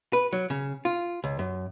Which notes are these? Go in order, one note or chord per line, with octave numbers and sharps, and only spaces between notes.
B4
F#3
C#3
F4
C#2
F#2